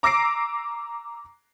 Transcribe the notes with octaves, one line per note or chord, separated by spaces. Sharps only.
A#5 D6 E6 A#6 C7 D7